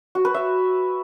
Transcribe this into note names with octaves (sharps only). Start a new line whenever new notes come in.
F#4
B4
E5